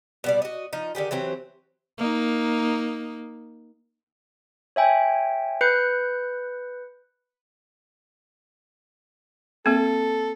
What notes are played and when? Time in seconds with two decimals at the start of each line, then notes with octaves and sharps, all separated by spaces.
0.24 B2 G3 D5
0.42 F#4 D#5
0.73 F3 D#4
0.95 D3 D#3 G4 G#4
1.11 E3 F#3 C4 G4
1.98 A#3 D#4
4.76 C#5 E5 G5 G#5
5.61 B4 F#6 G6 C#7
9.66 A#3 C4 A4